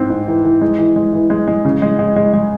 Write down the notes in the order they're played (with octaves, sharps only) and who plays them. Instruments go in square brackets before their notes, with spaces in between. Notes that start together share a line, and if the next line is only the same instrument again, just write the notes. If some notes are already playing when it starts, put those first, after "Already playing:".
Already playing: [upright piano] G#2 C4
G#2
E3
E3
G#3
E3
G#3
E3
G#3
G#3
C#3
G#3
G#3
G#3
G#3